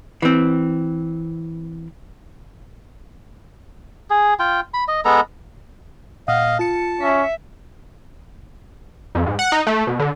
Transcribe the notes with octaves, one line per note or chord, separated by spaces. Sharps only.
E3 C4
G#4
F4 G5
B5
D#5
G#3 B3 A4 A#5
A#2 D#5 F5 F#5 D#6
F4 A5 C#7
C#4 E5
F2
G#2
F#5
D#4
A3
B2
D3